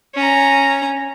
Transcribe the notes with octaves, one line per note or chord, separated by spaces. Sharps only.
C#4 A#5